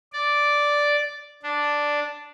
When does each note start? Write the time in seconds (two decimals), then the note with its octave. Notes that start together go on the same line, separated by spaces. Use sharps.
0.13 D5
1.43 D4